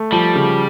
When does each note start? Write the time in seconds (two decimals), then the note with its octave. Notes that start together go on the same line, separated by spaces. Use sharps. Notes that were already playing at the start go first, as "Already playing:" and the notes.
Already playing: A3
0.12 F3 G3
0.35 C#3